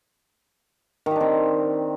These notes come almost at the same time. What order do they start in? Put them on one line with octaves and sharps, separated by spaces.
D#3 G4 D4 C4